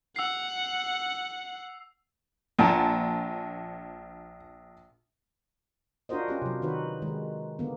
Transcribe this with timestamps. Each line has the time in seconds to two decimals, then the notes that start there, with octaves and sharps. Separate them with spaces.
0.16 F#5 E6 C7
2.59 A#1 A#2 F#5 A5
6.09 D4 F4 F#4 A#4 C5 D#5
6.28 C#4 F4 G4
6.42 C3 F#3
6.62 D#3 D#4 F#4 B4
7.02 D#3 G#3
7.59 D3 A#3 B3